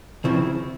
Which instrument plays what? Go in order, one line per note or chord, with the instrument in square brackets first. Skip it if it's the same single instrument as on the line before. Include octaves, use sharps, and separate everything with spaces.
[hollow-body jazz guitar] C#2 C#3 F3 C4 E4